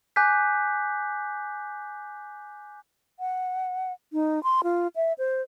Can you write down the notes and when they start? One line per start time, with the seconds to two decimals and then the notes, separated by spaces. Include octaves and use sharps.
0.16 G#5 D6 F#6 G6 B6
3.19 F#5
4.13 D#4
4.43 C6
4.64 F4
4.96 E5
5.18 C5